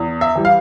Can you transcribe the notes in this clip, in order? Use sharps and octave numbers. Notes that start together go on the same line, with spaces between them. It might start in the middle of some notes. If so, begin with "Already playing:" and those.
Already playing: E2
E5
E3 G3
F5